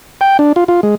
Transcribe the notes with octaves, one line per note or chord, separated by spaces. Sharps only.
G5
D4
F4
F4
G#3